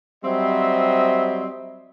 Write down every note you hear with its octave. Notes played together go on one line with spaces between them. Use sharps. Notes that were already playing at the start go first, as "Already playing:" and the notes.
F#3 G3 C4 C5 D#5 E5